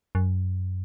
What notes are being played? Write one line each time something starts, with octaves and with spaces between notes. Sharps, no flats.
F#2